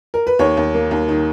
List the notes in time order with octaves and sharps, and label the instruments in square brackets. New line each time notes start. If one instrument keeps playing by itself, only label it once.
[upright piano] A#4
B4
D#2 C#5
D#2
A#3
D#2
D#3